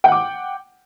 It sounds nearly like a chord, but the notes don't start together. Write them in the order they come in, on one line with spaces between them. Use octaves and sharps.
G5 F#5 D6